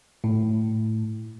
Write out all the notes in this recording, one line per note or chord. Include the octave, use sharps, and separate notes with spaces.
A2